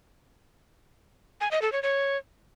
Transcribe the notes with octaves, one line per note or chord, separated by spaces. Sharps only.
G#5
D#5
A4
C#5
C#5